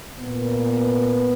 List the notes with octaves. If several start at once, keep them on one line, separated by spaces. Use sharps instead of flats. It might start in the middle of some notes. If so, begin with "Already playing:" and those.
A#2 B3